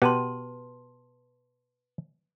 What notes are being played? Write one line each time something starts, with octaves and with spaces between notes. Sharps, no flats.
B2 G4 B4 F#5 A5 C6